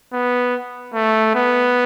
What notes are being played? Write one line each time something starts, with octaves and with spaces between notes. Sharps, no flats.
B3
A3
B3